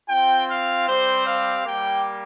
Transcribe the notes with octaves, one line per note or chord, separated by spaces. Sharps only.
C4 F4 G5
F5
G3 C4 G4 C5
F5
G3 A#3 G4 G5